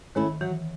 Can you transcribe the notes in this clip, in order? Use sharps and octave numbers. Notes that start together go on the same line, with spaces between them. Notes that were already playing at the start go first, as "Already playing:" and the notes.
D#3 A3 C#4 E4
E3 F#3